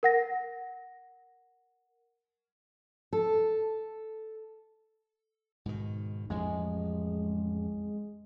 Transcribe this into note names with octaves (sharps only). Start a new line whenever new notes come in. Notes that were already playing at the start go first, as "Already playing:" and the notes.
A#4 F#5 A#6
A4
G#2 B2 D#3
A1 F2 G#3